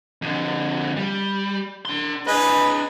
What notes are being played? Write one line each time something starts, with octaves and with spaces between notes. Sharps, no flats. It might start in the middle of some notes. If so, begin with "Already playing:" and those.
F2 D3
G3
D4 C6
D4 G#4 B4 D#5